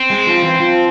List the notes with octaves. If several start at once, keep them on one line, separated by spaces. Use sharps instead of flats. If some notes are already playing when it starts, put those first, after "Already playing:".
Already playing: C4
G#3
F3
E3
E3
F3